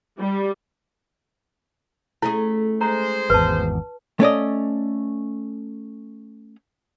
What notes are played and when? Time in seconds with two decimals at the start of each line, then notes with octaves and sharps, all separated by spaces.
0.20 G3
2.22 A3 C#4 E4 G#4
2.81 G#3 C5 A#5
3.30 G#1 E2 B4 A5
4.20 A3 C#4 D5 D#5